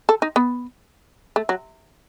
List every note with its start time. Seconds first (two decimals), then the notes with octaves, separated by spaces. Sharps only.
0.09 A4
0.22 D#4
0.36 B3
1.36 A3
1.49 F#3